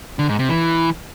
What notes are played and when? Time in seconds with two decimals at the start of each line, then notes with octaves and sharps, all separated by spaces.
0.19 D3
0.29 G#2
0.39 C3
0.49 E3